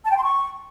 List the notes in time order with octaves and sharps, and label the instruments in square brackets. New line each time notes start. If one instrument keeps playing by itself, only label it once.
[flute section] A5
G5
C6
C#6